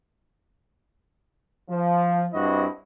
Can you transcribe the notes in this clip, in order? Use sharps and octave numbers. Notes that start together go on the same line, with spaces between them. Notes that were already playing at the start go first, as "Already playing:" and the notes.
F3
G2 C4 E4 F#4 D#5